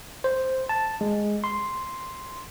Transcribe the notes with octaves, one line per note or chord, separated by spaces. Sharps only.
C5
A5
G#3
C6